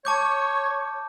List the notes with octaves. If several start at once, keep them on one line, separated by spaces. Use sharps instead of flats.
C#5 A5 D6 G6